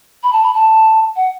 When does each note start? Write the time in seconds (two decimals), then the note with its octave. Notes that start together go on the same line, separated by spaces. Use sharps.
0.23 B5
0.33 A5
0.44 B5
0.54 A5
1.16 F#5